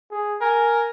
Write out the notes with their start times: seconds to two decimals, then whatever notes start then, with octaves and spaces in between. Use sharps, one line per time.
0.11 G#4
0.41 A#4 G#5